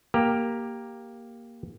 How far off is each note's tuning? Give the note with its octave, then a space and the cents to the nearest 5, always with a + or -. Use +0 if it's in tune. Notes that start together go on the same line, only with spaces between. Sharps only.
A#3 +0 G4 +0 A#5 +0